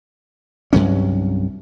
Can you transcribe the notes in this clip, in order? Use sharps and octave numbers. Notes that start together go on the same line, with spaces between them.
C2 G2 F#3 C#4